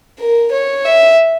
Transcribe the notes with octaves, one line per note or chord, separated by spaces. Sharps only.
A#4
C#5
E5